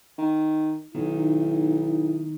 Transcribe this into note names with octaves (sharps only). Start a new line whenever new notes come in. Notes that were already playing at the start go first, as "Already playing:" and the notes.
D#3
B1 D#3 E4